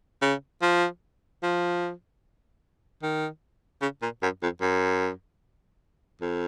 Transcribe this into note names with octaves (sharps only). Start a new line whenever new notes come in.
C#3
F3
F3
D#3
C#3
A#2
F#2
F2
F#2
F2